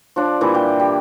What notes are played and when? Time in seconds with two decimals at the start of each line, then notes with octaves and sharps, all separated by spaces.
0.16 F3 D4 D5
0.41 A#2 E3 G3 E4
0.54 G4 G5
0.79 G4